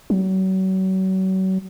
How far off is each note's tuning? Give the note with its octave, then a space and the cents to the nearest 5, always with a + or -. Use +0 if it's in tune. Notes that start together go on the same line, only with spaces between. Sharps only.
F#3 +35